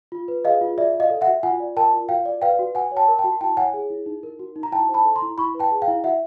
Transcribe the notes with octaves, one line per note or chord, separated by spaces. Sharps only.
F4
B4
G#4 D#5 F5
F4
F#4 D5 E5
D5
D#5 F5
A4
E5 F#5
F#4
F4 F#5 G#5
D5
A#4 G5 A5
F4
F#4 F5 G5
D5
B4 F5 G5
F#4
F#4 F#5 G#5
C#5
G5 A5
A#4
G5 A5
F#4
E4 G5 A5
C#5 F#5 G#5
G#4
E4
D#4
A#4
F#4
D#4
A#5
E4 G5 A5
C5
A5 B5
A4
A#5 C6
E4
E4 B5 C#6
B4
G5 A5
G#4
F5 G5
E4
F#4 E5 F#5